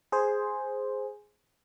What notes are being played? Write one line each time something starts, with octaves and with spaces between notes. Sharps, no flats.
G#4 C5